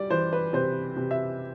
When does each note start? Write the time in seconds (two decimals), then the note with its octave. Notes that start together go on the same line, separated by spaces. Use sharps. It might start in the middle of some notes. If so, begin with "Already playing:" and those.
Already playing: G3 D5
0.10 E3 C5
0.33 B4
0.53 C3 C5
0.97 C3
1.11 E5